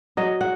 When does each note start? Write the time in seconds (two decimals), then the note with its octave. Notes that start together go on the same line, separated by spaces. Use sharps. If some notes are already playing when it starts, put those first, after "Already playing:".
0.17 F#3 D#5
0.41 F#5